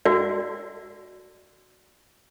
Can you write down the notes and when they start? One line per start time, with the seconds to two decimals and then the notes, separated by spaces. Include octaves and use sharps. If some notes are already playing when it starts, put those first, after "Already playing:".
0.05 F#4 D5